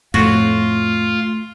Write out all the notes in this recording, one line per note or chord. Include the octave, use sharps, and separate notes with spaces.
F2 A2 A3 F4 F#4